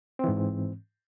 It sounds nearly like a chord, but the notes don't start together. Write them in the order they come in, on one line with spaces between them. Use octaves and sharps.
C4 E3 G#2